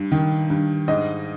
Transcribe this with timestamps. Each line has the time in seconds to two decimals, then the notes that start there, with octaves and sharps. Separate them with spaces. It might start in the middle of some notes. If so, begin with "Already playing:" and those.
Already playing: G2
0.12 D#3
0.50 G2
0.88 G#2 D#5